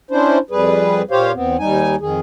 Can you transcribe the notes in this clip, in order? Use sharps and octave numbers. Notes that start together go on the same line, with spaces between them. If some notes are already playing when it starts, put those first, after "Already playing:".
C#4 D4 E4 C5
F2 G3 G#4 B4
A#2 G4 C5 C#5 F5
E2 B3 C4
D#2 G3 D#4 G#5
F2 D#3 G#4